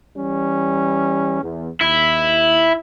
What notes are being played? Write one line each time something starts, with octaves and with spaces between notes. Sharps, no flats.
E3 G3 C#4
E2
D#2 E4